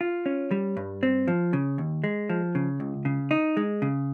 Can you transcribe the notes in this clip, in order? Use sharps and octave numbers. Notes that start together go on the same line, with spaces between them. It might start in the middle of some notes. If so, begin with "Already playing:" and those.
F4
C#4
G3
G2
C4
F3
C#3
D#2
G#3
F3
C#3
C#2
C#3
D#4
G#3
C#3